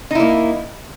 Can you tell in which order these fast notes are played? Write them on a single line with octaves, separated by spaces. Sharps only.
D#4 E4 A#3